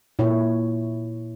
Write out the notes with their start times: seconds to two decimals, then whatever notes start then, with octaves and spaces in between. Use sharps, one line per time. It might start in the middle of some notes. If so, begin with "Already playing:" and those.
0.19 A#2 E4 C#5